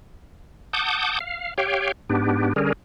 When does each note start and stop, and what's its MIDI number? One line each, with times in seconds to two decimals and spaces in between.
0.73 1.19 78
0.73 1.19 81
0.73 1.19 86
0.73 1.19 87
0.73 1.19 91
1.20 1.54 77
1.58 1.92 67
1.58 1.92 73
1.58 1.92 77
1.58 1.92 79
2.09 2.53 44
2.09 2.53 59
2.09 2.53 62
2.09 2.53 67
2.56 2.72 50
2.56 2.72 55
2.56 2.72 61
2.56 2.72 68
2.56 2.72 70